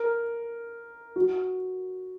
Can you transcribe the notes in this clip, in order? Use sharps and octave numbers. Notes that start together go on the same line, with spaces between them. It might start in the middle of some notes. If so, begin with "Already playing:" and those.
Already playing: A#4
F#4